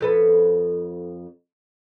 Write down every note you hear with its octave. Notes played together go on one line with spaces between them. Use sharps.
F2 A4 B4